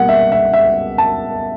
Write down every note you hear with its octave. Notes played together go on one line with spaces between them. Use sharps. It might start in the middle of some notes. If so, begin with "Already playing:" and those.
Already playing: B2 G3 A#3 F#5
E5
E5
E5
A5